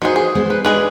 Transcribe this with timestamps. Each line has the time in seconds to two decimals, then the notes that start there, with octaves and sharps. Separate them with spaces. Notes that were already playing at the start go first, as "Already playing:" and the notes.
0.02 D#3 F#4 G#4 B4 C5
0.16 G#4
0.35 G#3 B3 C5
0.50 B4
0.65 G#3 D4 G#4 B4